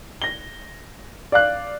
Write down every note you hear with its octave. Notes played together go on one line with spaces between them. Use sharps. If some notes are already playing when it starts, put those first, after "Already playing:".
A#6 G7
D5 F5 F#6